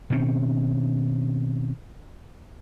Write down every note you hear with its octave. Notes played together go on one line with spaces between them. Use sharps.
B2 D#3 C4 C#4